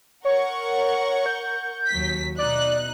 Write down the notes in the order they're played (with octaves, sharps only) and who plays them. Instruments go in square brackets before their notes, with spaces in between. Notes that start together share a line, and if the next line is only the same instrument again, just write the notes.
[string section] A#4 F#5 C#6 [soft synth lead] C#5
[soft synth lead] G6
[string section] D#2 F#3 B6
[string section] B2 D#4 F#6 [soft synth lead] D5